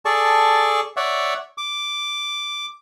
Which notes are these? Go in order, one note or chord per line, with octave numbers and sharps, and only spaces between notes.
G#4 A4 D5 A5 C#6
C#5 D5 E5 F#5
D6